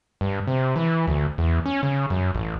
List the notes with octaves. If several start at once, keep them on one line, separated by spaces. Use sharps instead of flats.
G2
C3
E3
D2
E2
C#4
C#3
F#2
A1